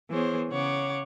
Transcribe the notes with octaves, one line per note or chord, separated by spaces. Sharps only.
E3 B3 G#4 C5 C#5
C#3 C#5 F#5 D6